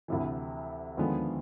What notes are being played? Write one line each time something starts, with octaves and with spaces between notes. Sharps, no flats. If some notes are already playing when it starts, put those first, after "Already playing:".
D2 C3 E3
D#2 D3 F3 G#3 B3